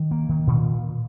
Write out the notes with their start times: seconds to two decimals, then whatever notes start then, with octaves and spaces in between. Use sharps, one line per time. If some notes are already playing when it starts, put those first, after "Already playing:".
Already playing: D#3
0.11 A#3
0.29 D#3
0.47 A#2